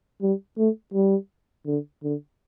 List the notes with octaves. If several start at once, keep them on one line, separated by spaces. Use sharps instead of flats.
G3
A3
G3
D3
D3